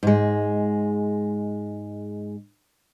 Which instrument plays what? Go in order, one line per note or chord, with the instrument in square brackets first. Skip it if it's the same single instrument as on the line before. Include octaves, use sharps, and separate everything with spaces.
[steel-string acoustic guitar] G#2 G#3